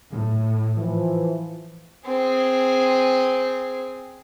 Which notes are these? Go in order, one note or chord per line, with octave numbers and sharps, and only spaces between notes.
A2
E3 F3
C4 G#4